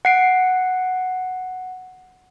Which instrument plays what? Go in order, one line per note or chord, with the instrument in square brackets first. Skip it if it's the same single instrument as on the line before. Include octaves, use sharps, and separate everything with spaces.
[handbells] F#5 C7 D7